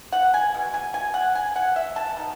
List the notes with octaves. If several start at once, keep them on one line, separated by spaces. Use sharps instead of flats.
F#5
G#5
B2 G#3
G#5
G#5
F#5
G#5
F#5
E5
A5
B2 G#3 D#4